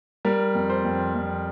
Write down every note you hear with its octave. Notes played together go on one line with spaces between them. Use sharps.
G3 A#4
F2
C5
F2
F2